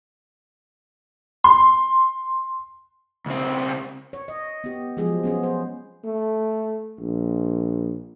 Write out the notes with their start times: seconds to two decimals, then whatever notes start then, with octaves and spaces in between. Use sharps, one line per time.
1.44 C6
3.26 C#2 C4
4.13 C#5
4.28 D#5
4.64 B3 G4
4.97 F3 F#3 G#3 G#4
5.23 B3 C#4 G#4
5.43 C5
6.04 A3
6.99 A#1